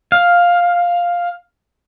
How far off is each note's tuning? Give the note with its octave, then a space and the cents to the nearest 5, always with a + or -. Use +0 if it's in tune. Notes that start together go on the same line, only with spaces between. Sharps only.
F5 +5